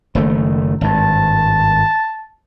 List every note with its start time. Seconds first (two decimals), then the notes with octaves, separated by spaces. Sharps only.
0.15 F#1 D#3 A3
0.81 G#1 G2 A5